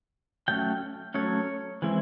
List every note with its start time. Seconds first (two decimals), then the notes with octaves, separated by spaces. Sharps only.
0.48 F#3 A3 C#4 G5
1.14 F#3 A3 C#4 C#5
1.82 E3 G#3 C4 E4